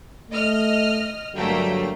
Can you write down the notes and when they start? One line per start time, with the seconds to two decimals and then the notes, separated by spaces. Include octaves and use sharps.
0.30 A3 D#5 F6
1.34 G2 D3 F#3 A3 A#3 G5